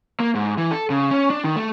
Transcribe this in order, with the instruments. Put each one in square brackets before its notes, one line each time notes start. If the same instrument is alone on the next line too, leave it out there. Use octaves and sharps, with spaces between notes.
[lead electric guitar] A#3
G#2
E3
A4
C#3
C#4
D4
D#3
A3